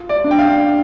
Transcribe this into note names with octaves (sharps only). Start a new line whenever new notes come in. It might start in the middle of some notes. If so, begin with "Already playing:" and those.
Already playing: F4
D5
D4
G5
F5
D4